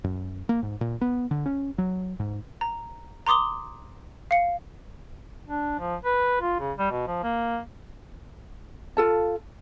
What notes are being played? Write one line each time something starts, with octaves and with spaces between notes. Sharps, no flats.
F#2
A#3
G#2
A#2
B3
D3
C#4
F#3
G#2
A#5
A#5 C6 D6 D#6 G7
F5 C#7
D4
F3
B4
F4
C#3
G3
B2
F3
A#3
F4 A4 A5